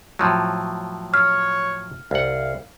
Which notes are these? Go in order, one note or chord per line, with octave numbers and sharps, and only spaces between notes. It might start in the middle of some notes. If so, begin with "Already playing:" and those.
A2 F3 F#3
C#5 F6
C2 F5 F#5